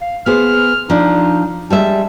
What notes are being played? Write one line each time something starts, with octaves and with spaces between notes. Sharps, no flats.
F5
B3 G#4 C5 F6
F3 D4 D#4
G3 G#3 E5 A5